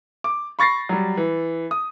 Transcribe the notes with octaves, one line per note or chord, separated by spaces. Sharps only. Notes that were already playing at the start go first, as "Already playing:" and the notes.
D6
B5 C#6 A6 A#6 C7
F#3 G3
E3
D#6